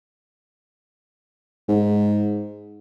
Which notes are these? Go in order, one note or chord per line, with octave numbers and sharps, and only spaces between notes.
G#2